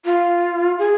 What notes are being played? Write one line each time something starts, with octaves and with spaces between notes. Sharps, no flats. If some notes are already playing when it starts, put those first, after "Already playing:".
F4
G#4